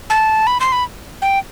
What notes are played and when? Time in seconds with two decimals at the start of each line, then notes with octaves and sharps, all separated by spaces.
0.10 A5
0.47 B5
0.60 C6
0.72 B5
1.22 G5